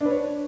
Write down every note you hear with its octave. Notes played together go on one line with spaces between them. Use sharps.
D4 B4 C#5